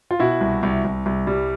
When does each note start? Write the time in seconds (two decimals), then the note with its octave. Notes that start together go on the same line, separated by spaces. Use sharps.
0.11 F4
0.19 B2 E4 F#4
0.41 C2
0.63 C2
0.85 C2
1.06 C2
1.27 G3